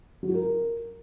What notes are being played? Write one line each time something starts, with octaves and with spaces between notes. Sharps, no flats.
F#3
F#4
A#4